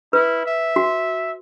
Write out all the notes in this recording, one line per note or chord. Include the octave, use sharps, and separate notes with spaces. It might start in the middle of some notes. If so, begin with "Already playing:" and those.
E4 B4
E5
F#4